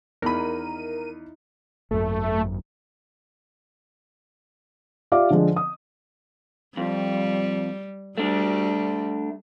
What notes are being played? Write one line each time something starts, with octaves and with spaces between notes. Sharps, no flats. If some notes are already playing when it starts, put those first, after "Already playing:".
E2 D#4 E4 A#4 B5 D#7
G#1 F#2 A3
F4 G4 D5 E5 F5 D6
D3 F3 G#3
D#6
F2 G3
G3 A3 D4